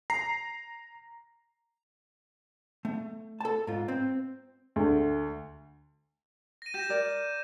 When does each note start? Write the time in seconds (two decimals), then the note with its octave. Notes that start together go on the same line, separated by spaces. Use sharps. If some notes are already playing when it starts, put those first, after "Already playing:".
0.10 A#5 C7
2.85 A3
3.40 A4 A5
3.67 G#2 F4
3.88 C4
4.76 D2
6.62 A#6 D#7
6.74 G4 G6 A#6 E7
6.89 A#4 D5